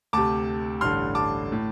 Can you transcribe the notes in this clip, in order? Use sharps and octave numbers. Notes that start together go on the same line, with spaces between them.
D2 C3 A5 D6
A1 G2 D3 C6 F6
A5 D6
A2